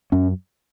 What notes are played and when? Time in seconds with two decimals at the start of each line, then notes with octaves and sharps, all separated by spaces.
0.12 F#2 C#4